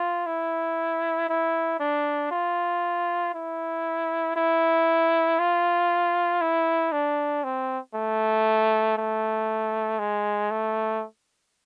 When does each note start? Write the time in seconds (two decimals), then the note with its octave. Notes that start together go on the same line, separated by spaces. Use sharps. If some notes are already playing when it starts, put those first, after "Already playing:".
Already playing: F4
0.26 E4
1.29 E4
1.80 D4
2.32 F4
3.34 E4
4.36 E4
5.39 F4
6.41 E4
6.92 D4
7.44 C4
7.95 A3
8.98 A3
9.99 G#3
10.51 A3